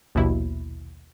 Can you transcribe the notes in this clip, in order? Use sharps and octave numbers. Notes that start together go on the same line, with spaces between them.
A#1 D#2 B2 E4